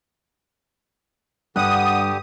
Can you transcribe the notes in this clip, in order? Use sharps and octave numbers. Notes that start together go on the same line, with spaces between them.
G2 D3 G4 F#5 D#6